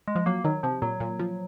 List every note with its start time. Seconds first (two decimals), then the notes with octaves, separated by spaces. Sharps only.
0.08 G#3
0.15 F3
0.26 F#3 A#3
0.44 D#3 F#3
0.63 C3 F3
0.82 A#2 F#3
1.00 A#2
1.19 F3